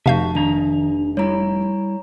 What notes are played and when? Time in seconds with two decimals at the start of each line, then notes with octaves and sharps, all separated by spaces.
0.06 F1 C3 F#4 E5 F5 A5 G6
0.35 D#3 D4 A#5
1.17 G3 E4 C#5 A#5